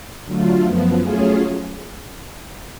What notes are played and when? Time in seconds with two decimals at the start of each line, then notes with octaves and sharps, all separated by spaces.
0.25 D3 F#3 A3 F4
0.62 F#2 F3 B3
1.00 F#3 A3 C#4 F4 G#4